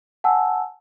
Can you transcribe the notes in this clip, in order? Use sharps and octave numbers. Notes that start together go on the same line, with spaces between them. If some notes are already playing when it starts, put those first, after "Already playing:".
F#5 G#5 A5 E6